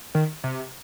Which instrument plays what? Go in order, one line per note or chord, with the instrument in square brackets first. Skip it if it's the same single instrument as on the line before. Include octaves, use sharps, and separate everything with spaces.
[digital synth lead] D#3
C3